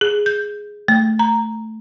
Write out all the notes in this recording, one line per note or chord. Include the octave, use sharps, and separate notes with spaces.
G#4
G6
A3
A#5